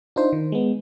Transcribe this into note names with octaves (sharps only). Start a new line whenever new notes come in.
D4 D#4 F4 C5
D#3
G#3 B3